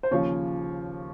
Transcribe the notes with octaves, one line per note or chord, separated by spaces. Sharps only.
C5
D#2 C#3 F3 C#5